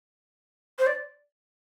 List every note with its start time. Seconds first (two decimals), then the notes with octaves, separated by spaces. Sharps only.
0.79 C5
0.86 D5